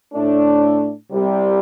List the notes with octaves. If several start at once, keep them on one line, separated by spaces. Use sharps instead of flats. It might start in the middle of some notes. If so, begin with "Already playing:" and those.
A2 A3 D4
C2 C3 G3